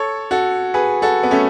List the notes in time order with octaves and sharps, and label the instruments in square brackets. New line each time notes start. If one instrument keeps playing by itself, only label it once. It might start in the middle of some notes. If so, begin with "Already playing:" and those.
Already playing: [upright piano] A4 C#5
F#4 A4
G#4 B4
F#4 A4
B3
A3 C#4